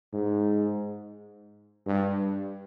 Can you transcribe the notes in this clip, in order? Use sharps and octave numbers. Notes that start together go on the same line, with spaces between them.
G#2
G2